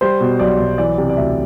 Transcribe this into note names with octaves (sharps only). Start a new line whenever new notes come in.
G3 C5
B2
B1 D5
B1
E3 D5
C3
D5
D2 E5